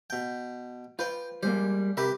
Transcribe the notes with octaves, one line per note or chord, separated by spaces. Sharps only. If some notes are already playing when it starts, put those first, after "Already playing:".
B2 G5
F4 B4 C5 G5
G3 G#3 A#3 C5
C3 G4 A#4 B4 E5 B5